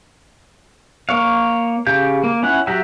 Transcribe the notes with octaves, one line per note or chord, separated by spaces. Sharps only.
A#3 C#5 F5
C#3 G4 F5 G6
A#3
C#4 E4 F#5
F#3 F#4 G4 E5